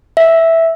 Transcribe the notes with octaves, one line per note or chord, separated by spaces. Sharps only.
E5